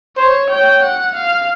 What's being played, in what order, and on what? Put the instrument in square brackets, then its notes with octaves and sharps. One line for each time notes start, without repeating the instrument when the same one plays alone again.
[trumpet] C5 [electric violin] C#5
[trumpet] C#5 [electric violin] G5
[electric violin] F#5
F5